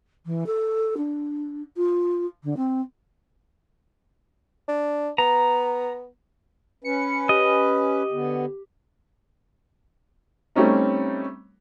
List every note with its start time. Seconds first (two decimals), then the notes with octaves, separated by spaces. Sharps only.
0.26 E3
0.47 A4
0.97 D4
1.77 F4
2.44 D3
2.57 C4
4.68 D4
5.18 B3 A#5
6.84 C#4 B4 C#7
7.29 G4 D#5
8.12 D3 B3
10.56 G3 A3 C4 C#4 D#4